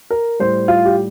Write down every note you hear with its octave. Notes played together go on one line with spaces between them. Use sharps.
A#4
A2 G3 C5
F4
G4